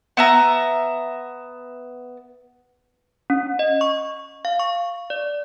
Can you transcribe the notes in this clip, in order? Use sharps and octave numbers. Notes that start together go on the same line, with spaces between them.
B3 E5 A#5
C#4
D#5
C#6
F5
C#6
D5